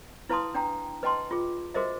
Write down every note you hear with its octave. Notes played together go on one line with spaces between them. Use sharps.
E4 B4 F5 A5 C6 D#6
D4 G5 A#5
B4 D#5 G5 A5 C6
F4 G#4
F#4 G#4 A#4 C5 D#5 E5